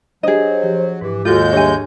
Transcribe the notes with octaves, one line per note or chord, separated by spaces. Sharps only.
F#3 D4 G4 G#4 C5 D#5
F3 G4
G#2 E3 G4
D#2 G#3 F4 F#4 A4 G6
G3 D4 G4 C#5 E5 G#5